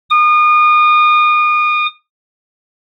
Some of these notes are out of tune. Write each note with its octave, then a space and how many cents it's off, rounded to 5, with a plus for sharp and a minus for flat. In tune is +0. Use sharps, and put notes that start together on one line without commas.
D#6 -35